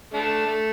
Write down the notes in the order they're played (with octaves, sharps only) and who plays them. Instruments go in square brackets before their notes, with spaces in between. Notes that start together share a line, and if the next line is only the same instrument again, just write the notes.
[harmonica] A3 D4
A3